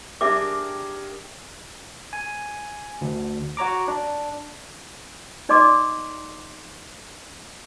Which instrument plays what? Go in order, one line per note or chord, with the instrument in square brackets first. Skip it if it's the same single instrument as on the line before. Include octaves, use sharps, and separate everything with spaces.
[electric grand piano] D4 G#4 A#4 [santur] G4 [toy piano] E5 D6
[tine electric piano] G#5
D2
F#4 C#5 A#5 D6
D4
[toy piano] D#4 D5 D#5 C6 D6